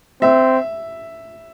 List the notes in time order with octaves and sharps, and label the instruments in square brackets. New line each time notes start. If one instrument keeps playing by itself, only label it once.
[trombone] C4 [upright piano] E5